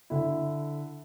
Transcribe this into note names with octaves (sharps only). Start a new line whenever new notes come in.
D3 E4